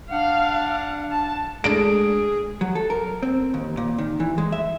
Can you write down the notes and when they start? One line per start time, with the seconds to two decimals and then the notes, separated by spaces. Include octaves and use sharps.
0.10 D4 F5 F#5
1.11 A5
1.64 G#3 A3 D4 G#4 A4 D7
2.61 F#3
2.75 A4
2.90 A#4
3.23 C4
3.54 D#2
3.77 A#2
3.98 D#3
4.20 E3
4.38 G#3
4.52 E5